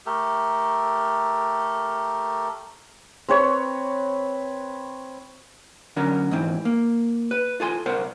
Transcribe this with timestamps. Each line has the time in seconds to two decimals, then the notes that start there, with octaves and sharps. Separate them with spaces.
0.06 A3 G4 A4 A#4
3.29 C4 B4 C#5 C#6
5.96 D3 F#3 C#4 A#4
6.31 G#2 E3 C4
6.65 A#3
7.31 B4
7.60 F4 A4 G#5 C6
7.86 C2 A#4 C5 F#5